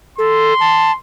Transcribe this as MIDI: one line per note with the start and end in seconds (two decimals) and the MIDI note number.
0.18 0.54 69
0.18 0.97 84
0.60 0.91 81